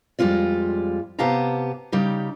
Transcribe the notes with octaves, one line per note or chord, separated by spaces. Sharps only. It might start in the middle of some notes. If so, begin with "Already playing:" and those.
F2 G3 G#3 C#4 F4 D5
C3 B3 G4 F5 A5 A#5
C#3 G3 D#4 G4